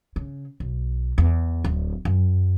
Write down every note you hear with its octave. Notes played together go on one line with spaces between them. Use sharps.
C#3
B1
E2
D1
F#2